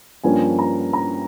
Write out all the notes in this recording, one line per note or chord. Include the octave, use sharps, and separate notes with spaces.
G2 F3 A#3 C#4 G#5
A#5
A#5